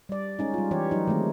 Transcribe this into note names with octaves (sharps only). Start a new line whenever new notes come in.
G3 D5
G#3 C#4 D#4
G3 F4
E3 G4 C#5
F#3 D#4
D#3 G#3 A3 C4